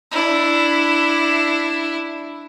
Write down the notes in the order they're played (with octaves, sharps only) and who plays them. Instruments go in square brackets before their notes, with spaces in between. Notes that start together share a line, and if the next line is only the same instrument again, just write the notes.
[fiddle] D4 E4